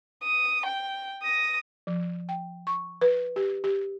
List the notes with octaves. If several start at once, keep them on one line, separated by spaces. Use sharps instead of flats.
D#6
G5
D#6 A#6
F3
G5
C#6
B4
G4
G4